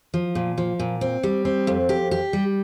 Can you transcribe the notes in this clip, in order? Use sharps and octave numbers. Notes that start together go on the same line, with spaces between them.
F3
A#2
F3
A#2
C4
G3
C4
F2
G4
G4
G3